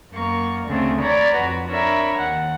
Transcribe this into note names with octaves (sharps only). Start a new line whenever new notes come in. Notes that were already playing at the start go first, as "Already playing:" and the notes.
F#2 A#3 C#6
D2 C#3 A3 C4 G#4
C#5 D5 A#5 B5
F2 F#4 B4
D4 A#4 C#5 E5 B5
D#2 F#5